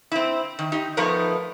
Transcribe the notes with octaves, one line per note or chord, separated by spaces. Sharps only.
C4 E4
D#3
D#4 G4
F3 A3 B3 D#4 A#4 C#5